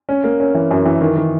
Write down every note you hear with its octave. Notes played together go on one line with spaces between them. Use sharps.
C#4
A#3
C#4
E3
F#2
E3
D#3
D#3